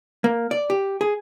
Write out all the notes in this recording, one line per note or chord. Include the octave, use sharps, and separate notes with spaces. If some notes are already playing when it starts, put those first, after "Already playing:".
A#3
D5
G4
G#4